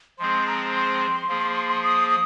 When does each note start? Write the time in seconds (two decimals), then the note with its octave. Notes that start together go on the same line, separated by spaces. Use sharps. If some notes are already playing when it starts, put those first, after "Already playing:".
0.19 F3 G#3 C4 G#4 C5 C6
0.47 A#5
0.75 C6
1.28 F3 A#3 G#4
1.83 D#6
2.10 D#6